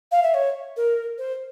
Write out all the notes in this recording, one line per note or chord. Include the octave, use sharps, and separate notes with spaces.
F5
E5
C#5
A#4
C5